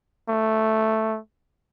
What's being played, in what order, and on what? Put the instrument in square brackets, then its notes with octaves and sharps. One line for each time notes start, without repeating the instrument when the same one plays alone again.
[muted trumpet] A3